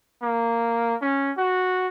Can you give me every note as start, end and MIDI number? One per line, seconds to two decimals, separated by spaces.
0.23 0.95 58
1.02 1.31 61
1.37 1.88 66